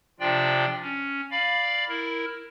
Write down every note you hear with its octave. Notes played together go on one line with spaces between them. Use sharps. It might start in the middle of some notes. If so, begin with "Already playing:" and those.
C3 F3 D4 F4 D5 G5
C#4
D5 F5 B5
E4 A#4